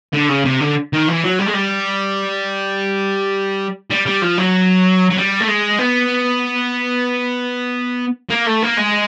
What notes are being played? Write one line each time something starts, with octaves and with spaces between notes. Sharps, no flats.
D3
C#3
C3
D3
D#3
E3
F#3
G3
G#3
G3
G3
G3
F3
F#3
F#3
G3
A3
G#3
B3
A#3
A3
A#3
G#3